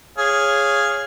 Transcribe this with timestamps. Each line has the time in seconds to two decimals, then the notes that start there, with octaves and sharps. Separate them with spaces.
0.18 G#4 C#5 F5